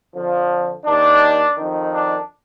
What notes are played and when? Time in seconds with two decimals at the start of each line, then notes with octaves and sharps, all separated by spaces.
0.14 F2 D3 F3
0.86 D#2 D#3 D4
1.57 F2 D#3
1.93 D4